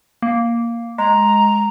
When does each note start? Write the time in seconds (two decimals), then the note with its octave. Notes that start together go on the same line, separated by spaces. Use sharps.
0.22 A#3
0.98 G#3 A#5